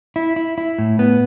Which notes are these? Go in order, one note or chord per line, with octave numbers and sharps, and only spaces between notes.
E4
E4
E4
A2
B3